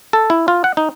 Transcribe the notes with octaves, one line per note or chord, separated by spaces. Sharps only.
A4
E4
F4
F#5
D#4